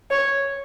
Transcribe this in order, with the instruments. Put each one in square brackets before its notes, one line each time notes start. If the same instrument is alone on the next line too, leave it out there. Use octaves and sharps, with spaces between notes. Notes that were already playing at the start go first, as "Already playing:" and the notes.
[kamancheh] C#5